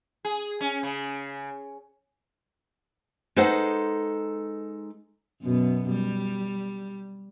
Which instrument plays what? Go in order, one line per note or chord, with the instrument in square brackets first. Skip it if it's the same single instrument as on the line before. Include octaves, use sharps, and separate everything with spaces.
[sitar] G#4
C#4
C#3
[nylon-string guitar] G#3 D#4 A4 B4 C5 F#5
[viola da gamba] F#2 B2 B3
G3